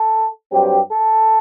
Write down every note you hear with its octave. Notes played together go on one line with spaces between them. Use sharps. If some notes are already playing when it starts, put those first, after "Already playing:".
Already playing: A4
G2 F#3 C4 G4
A4